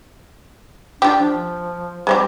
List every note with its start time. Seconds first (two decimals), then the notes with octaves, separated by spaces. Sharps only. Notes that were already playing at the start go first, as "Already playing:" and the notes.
1.02 D4 F4 G4
1.22 F3
2.07 G3 G#3 C4 G4